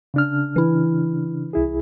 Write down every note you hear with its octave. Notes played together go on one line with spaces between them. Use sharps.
C#3 D4 F6
E3 E4
C2 E4 G#4